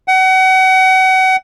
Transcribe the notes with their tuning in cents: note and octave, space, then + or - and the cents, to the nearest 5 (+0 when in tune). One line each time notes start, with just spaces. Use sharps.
F#5 +30